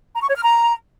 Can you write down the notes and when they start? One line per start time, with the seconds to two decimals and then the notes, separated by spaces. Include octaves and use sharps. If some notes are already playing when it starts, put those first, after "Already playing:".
0.15 A#5
0.22 C#6
0.29 C#5
0.36 F6
0.43 A#5